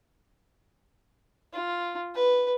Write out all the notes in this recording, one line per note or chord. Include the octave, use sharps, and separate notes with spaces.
F4
B4